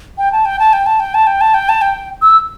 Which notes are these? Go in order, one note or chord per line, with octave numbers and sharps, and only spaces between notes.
G5
A5
G5
A5
G5
A5
G5
A5
G5
A5
G5
A5
G5
E6